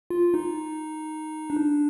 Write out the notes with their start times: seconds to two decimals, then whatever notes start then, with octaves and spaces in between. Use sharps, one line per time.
0.10 F4
0.34 D#4
1.50 D4